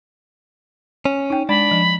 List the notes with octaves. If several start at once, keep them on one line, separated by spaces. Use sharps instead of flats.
C#4
D#4 G5
G#3 D4 B5
F3